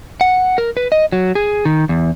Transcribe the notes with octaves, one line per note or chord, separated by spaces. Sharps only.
F#5
A#4
B4
D#5
F#3
G#4
D#3
E2